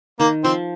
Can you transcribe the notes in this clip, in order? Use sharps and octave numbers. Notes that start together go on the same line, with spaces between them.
D#3 A#3
F3 C4